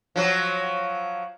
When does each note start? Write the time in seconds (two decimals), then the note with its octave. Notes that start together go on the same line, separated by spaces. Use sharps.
0.16 F3 F#3